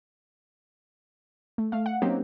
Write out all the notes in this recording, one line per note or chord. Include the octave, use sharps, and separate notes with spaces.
A3
A3 F5
F#5
F#3 A#3 C4 C#4 D#4 G4